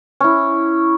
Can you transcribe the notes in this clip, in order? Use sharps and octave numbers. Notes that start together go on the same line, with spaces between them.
C#4 E4